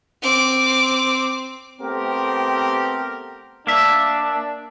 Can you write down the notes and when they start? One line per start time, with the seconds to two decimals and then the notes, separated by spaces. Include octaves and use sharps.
0.22 C4 D6
1.81 A3 B3 C4 G4 A#4
3.67 A#3 D4 E5